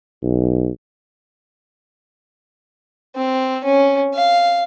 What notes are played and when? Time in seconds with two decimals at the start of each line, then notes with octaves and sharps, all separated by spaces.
0.23 B1
3.16 C4
3.64 C#4
4.15 F5